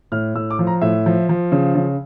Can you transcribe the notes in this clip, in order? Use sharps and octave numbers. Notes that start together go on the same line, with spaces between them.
A2 F6
A2 E6
D6
F3
A#5
A2 E5
F3
F3
C#3
C#3